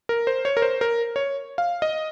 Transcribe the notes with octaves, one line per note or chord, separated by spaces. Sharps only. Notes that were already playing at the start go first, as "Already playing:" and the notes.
A#4
C5
C#5
A#4
C5
A#4
C#5
F5
D#5